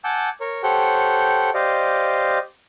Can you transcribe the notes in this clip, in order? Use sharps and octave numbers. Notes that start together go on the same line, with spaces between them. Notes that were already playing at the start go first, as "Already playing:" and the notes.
F#5 G#5 A5 D6 E6 G6
A#4 C#5
G4 A4 C5 C#5 F#5 G5
G4 C5 D5 D#5 F5